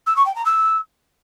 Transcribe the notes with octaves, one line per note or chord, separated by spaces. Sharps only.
E6
C#6
G5
A#5
E6